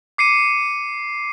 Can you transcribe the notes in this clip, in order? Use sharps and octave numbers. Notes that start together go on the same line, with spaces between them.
D6 C7 C#7 D#7